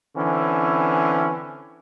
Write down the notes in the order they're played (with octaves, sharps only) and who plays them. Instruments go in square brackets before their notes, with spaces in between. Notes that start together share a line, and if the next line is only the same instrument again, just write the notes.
[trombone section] D3 E3 C4 C#4